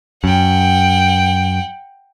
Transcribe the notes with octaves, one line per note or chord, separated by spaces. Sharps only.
F#2 F#5 G5